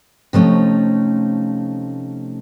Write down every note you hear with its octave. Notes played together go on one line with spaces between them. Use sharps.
C3 F3 A3 C#4 D#4